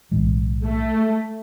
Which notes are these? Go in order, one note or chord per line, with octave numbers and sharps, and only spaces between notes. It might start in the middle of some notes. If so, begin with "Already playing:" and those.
B1 A2 E3 G#3
A3